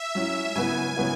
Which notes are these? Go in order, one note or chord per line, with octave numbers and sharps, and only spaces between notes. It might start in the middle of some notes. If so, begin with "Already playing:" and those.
Already playing: E5
F#3 C#4 E4
C#3 F#3 B3 E4 G#5
C#3 F#3 B3 E4